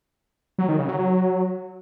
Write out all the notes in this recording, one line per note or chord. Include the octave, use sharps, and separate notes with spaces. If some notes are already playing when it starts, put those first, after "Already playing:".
F#3
D#3
C#3
F#3
F#3